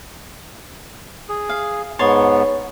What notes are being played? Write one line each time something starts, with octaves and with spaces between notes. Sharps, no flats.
G#4
F5
G#2 B3 C#5 A5 C6